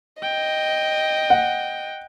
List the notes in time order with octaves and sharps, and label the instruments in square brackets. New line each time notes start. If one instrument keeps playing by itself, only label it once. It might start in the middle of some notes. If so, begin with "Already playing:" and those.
[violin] D#5 [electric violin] G5
[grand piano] F#5